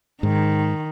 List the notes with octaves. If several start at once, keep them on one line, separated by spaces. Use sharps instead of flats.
G#2 D#3